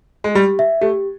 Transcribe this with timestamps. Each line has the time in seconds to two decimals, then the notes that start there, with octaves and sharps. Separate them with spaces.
0.24 G#3
0.35 G3 G4
0.59 E5
0.81 A3 G4